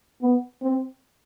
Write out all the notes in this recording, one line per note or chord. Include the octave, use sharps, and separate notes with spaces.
B3
C4